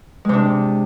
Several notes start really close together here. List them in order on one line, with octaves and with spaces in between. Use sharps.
G#3 C3 D4